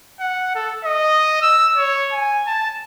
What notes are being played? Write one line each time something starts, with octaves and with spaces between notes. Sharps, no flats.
F#5
A4
D#5
E6
C#5
G#5
A5